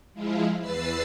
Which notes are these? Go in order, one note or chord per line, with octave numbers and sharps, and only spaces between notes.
F3 G#3 E4 F4
E2 B4 E6 A6 C7